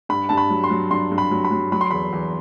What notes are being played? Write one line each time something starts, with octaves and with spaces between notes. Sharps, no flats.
G2 B5
G2 A5
B5
F#3
C6
F#3
G2 C6
G2
B5
F#3
B5
F#3
F#3 B5
C6
E2 B5
E2